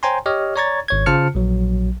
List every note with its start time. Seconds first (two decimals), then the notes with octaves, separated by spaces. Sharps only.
0.03 C5 C#5 G5 G#5 A#5 C6
0.26 G4 C#5 D#5 F6
0.56 C#5 D5 A#5 C#6 G#6 A6
0.88 G#1 C#5 G#6
1.06 C#3 F4 C5 A5 F6 C#7
1.35 A#1 F#3